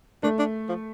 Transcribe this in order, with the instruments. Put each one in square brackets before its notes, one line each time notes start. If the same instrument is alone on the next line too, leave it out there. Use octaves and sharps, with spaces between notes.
[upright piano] A3 [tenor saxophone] D4
[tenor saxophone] D4
F3